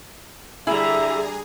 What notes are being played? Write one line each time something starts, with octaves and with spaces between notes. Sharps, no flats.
D3 G3 E4 G#4 E5 A#5